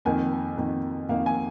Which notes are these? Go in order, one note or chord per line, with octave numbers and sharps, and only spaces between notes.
F2 D#3 A#3 G#5
F2 D#3 A#3
F2 D#3 A#3 F5
G#5